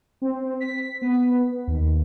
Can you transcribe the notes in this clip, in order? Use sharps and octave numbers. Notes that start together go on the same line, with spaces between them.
C4
B6
B3
D#2